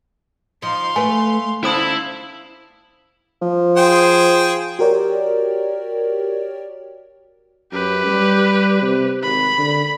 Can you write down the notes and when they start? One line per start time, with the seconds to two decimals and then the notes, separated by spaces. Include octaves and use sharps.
0.62 F3 D#4 F5 C6
0.96 A3 B4 G#5
1.63 D3 C#4 E4 C5 F5 A5 B5 D#6
3.42 F3
3.77 G#4 C5 G5
4.79 F#4 G4 A#4 C#5 D5 G5
7.73 F#2 G4 B4
8.07 G3
8.82 C3
9.23 G#1 B5
9.58 D3